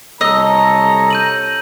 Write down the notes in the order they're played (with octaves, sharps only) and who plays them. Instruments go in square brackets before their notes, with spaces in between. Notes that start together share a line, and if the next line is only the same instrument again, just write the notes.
[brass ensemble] C2 A4 C#5 [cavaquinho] D#5 [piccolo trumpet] A#5 [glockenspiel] E6
[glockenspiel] G6 D#7 F#7